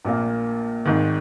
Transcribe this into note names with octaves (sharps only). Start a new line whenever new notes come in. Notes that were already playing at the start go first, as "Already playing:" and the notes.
A#1 A#2 A#3
G#1 G#2 D#3